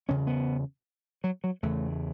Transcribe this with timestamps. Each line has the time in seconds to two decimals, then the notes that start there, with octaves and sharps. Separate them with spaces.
0.08 E2 C#3 C#4
0.27 B3
1.24 F#3
1.44 F#3
1.63 E2 C#3 A3